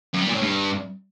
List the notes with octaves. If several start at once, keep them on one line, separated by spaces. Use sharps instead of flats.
F#2
G3
A#2
A2
G2